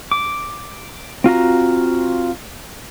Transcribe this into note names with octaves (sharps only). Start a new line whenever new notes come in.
D6
C4 F4 F#4 A#5